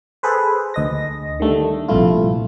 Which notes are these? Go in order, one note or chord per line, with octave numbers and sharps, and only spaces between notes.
G#4 A4 B4 C5
D2 D#5 A#6
D3 D#3 G3 A3
A#1 G2 C3 A3 E4 F4